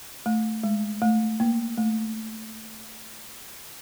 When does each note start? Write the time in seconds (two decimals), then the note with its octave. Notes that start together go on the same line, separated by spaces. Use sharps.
0.26 A3
0.63 G#3
1.02 A3
1.40 A#3
1.78 A3